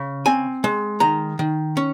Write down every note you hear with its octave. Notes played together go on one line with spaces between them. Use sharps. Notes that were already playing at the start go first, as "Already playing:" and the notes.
Already playing: C#3
C4 G#5
G#3
D#3 A#5
D#3
C#4